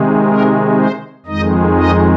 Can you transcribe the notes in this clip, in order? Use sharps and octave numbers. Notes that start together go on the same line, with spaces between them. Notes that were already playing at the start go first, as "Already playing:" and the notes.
Already playing: C3 D#3 G#3
A#4
C5
F2 D#3 G#3 D#4 D#5
D#4 D#5